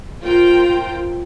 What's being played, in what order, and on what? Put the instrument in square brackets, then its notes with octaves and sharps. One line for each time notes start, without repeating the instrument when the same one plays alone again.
[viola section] F4 A#4 C5 G5